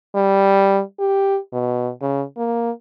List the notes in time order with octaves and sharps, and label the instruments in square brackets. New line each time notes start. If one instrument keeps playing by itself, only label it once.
[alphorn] G3
G4
B2
C#3
A#3